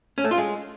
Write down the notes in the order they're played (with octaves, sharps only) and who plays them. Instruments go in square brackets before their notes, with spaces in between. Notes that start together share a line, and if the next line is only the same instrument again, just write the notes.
[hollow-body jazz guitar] C#4
A3
F4
G#3